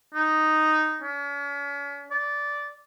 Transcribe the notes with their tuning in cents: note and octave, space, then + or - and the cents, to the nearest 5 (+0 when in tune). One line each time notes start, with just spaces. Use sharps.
D#4 -5
C#4 +40
D5 -10